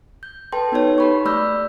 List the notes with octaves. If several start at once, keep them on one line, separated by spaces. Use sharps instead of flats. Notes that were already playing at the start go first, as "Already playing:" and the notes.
G6
A4 B4 G5 A5 C6
B3 D#4 F#4 B4 C#5
G4 B5 C#6
A3 D5 B5 E6 F6 G6